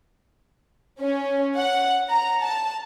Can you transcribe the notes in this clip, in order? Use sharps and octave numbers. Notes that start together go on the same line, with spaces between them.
C#4
F#5
A#5
A5